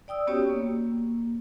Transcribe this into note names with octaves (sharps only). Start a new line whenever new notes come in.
D5 G5 D#6 E6
B3 C#4 F#4 G4 C#5
A#3